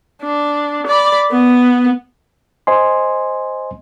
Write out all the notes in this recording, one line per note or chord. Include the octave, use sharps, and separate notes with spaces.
D4
D5 B5
B3
C5 D#5 G#5 C6